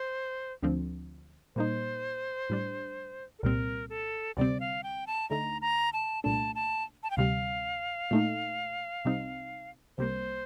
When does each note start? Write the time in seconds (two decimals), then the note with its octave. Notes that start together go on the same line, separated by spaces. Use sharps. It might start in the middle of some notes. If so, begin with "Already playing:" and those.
Already playing: C5
0.62 D2 D3 F3 C4
1.56 A#2 G3 A#3 D#4 C5
2.50 A2 G3 D4
3.39 A4
3.43 C2 A#2 G3 C4 A#4
3.90 A4
4.37 D2 C3 G3 C4 D5
4.60 F5
4.83 G5
5.07 A5
5.30 D2 D3 A3 D#4 A#5
5.62 A#5
5.93 A5
6.24 C2 A#2 A3 D4 A5
6.55 A5
7.03 A5
7.11 G5
7.17 D2 C3 G3 F5
8.11 A#2 A3 D#4
9.05 C2 C3 G3 C4 D#4
9.98 C2 C3 G3 A#3 C5